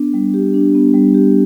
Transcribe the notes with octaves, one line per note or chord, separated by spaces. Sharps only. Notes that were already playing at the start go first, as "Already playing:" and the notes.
Already playing: B3 D4
G3
G4
D4
B3
G3
G4